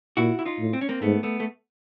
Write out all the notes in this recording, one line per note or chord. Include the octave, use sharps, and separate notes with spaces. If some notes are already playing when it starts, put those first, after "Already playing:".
A#2 E4 F#4
E4
D#4 F4
A2
C4
C#4
A#3 C4
G#2 A3 B3
A3 B3
A3